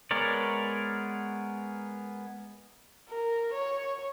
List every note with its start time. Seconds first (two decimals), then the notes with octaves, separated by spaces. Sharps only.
0.11 G#3 B3 A#4 C#5 D5
3.09 A#4
3.54 C#5